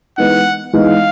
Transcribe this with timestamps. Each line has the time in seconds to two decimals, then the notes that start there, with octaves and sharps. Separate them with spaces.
0.18 E3 G#3 B3 D#4 F#5
0.73 E3 G#3 B3 D#4 F5